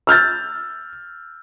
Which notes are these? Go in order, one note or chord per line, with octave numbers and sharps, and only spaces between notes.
E6 F6 G6 A6